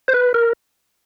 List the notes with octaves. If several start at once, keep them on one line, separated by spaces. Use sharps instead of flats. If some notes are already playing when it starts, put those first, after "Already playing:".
C5
B4
A#4